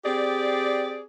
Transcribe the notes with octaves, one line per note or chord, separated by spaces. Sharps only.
C4 G4 G#4 D5